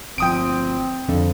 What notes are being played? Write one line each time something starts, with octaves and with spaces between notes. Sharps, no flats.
G1 F3 C4 G5 D#6 D7
F2 D3